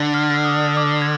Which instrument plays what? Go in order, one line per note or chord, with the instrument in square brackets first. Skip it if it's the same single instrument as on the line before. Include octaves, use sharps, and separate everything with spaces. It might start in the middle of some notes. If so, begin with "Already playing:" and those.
Already playing: [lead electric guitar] D3
[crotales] F6
D#6
D6
G#6